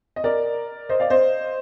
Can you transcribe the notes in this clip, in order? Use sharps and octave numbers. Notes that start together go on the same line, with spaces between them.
D#5
A#4 D5
C5 D#5
D5 F5
C5 D#5